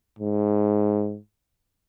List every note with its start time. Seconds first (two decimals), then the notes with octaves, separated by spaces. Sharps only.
0.19 G#2